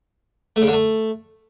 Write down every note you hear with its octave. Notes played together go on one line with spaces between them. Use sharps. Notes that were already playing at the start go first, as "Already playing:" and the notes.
A3
C#3
D3
A3